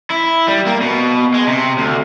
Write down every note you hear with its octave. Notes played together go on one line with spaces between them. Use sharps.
E4
G3
A#3
B2
G#3
C3
D2